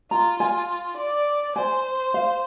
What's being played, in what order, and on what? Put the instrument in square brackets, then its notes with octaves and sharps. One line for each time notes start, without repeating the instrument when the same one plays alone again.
[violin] F4 [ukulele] A#5
[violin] F4 [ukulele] G#5
[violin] D5
[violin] C5 [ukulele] G#5
[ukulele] F5